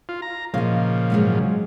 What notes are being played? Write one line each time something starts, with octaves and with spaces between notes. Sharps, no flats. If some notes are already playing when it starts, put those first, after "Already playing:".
F4
A#5
A#2 C#3 F3 D#5 F5
G#2 F#3 G#3